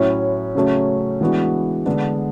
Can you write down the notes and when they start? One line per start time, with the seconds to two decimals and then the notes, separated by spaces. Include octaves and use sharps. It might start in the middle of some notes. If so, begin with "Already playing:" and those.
Already playing: A2 F#3 C#4 E4
0.55 C#3 F#3 A3 C#4
1.21 E3 G#3 B3 D4 F#4
1.86 D3 G#3 B3 D4